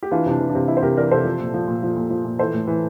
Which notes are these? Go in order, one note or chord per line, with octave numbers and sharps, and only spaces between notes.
G4
E3 D4 F4
C3 D4
E3
D4
C3
E3 E4
C5
C3 G4 A#4
E3 A#4 D5
C3 A4 C5
F3
A#2
F3
A#2
F3
A#2
F3
A#2
E3 A4 C5
A2
E3